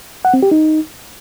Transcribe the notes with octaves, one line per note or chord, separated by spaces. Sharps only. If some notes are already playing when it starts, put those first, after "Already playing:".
F#5
C4
G4
D#4